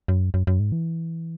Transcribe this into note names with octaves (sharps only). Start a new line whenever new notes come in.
F#2
F#2
F#2
G#2
E3